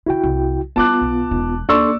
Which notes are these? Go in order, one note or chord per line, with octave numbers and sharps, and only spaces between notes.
D3 D#3 E4 F#4 G5
C2
G3 B3 E4 F4 A5 D6 F#6
B1
E1 D#4
D#2 D4 A4 D5 C6 C#6 E6